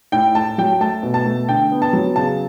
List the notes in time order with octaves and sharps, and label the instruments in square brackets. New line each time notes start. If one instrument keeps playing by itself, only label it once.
[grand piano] A2 G5
A3 A5
F#3 G5
A3 A5
B2
A5
A3
D3 G5
B3
A5
F#3
C#3 A5